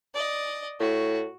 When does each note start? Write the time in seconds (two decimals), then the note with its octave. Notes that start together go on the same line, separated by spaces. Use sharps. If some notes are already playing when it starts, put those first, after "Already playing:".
0.14 D5 D#5
0.80 A2 F#4